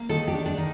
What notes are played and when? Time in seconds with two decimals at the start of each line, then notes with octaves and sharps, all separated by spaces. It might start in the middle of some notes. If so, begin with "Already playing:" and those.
Already playing: A#3
0.09 D#3 A4
0.28 G4
0.34 D4
0.46 D4
0.58 D#3